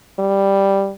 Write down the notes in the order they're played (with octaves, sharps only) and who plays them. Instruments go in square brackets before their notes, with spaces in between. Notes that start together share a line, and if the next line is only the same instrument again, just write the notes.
[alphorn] G3